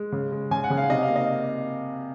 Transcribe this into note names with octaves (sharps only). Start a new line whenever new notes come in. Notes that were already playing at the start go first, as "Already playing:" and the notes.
Already playing: G#3
C#3
G#3
C#3 G#5
F#5
C#3
F5
C3 D#5
F5
A#3
D#5